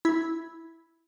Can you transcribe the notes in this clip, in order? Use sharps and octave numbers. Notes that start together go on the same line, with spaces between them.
E4 B5 G#6